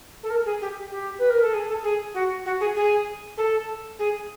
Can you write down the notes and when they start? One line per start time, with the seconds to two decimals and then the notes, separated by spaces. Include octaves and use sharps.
0.23 A4
0.30 A#4
0.45 G#4
0.61 G4
0.91 G4
1.19 B4
1.30 A#4
1.42 A4
1.53 G#4
1.68 A4
1.83 G#4
2.14 F#4
2.45 F#4
2.60 G#4
2.75 G#4
3.37 A4
3.99 G#4